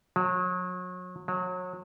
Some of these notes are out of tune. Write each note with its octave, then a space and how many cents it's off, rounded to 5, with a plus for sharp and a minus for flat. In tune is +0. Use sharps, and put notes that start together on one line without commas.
F#3 -35
F#3 -30